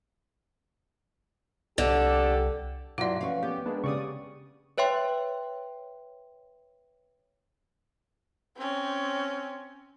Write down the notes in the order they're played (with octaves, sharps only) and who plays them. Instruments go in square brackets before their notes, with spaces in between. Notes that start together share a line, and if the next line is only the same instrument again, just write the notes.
[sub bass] C2 [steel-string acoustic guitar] D3 [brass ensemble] G4 A4
[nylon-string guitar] G2 F#3 E4 [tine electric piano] B2 C6 [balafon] F4 D5
[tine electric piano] F3 C#4 C#6 [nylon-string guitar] B4 F5
[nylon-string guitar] B3 [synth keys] G4
[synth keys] G#3 A#3 D4 [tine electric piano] B4
[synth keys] C#3 D5 D#6 [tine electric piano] G4 C#6
[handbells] B4 C#5 E5 G5 C6
[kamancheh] C4 C#4